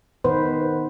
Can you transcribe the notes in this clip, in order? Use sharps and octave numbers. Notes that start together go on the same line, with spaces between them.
D#3 B3 B4 C5